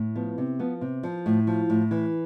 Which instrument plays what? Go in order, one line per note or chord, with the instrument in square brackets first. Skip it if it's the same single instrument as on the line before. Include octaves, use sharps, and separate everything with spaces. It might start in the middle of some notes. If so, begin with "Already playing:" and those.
Already playing: [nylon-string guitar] A2
F3 B3
C3
F3 B3
C3
F3
A2
F3
A2
E3